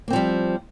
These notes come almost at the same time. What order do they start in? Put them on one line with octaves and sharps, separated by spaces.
A#3 C4 F3 G3